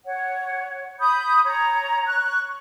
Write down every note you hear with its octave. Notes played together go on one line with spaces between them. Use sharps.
C#5 F#5
B5 D#6 G6
C#5 A#5
C#6 F#6